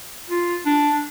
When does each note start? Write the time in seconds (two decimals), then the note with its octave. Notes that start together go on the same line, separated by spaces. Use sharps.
0.29 F4
0.65 D4